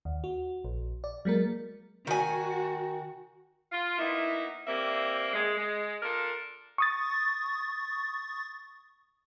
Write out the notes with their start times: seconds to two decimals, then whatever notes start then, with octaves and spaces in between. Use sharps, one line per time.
0.05 D#2
0.24 F#4
0.64 A#1
1.04 D5
1.25 F#3 G#3 A#3 A#4
2.07 D#3 F#4 G#5
3.72 F4
3.99 A#3 B3 D#4 E4
4.67 E3 G3 A#3 C4 E5
5.34 G#3
5.57 G#3
6.03 D4 F4 A4 A#4
6.78 C#6 D#6 A6